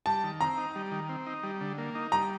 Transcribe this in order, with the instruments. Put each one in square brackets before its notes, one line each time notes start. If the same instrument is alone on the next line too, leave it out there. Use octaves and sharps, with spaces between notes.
[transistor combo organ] G3 [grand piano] A5
[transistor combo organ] D#3
[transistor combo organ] C4 [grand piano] A#5
[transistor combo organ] D#4
G3
D#3
C4
D#4
G3
D3
A#3
D#4
[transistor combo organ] G3 [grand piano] A#5